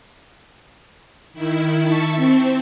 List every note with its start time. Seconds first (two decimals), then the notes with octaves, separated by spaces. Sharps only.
1.34 D#3 E4
1.82 E5 A5 C#6
2.16 C4